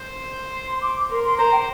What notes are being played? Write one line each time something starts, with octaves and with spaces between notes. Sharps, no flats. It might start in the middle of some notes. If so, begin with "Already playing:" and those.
Already playing: C5
C6
C6
D6
A#4 C6
C6
C5 A#5
G5